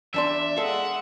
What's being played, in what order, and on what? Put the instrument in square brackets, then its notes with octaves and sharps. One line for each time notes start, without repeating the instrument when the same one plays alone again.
[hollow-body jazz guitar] E2 D4 C6 [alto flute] D5 [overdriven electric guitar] E5
[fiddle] G#3 F#5 [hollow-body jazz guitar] A4 F5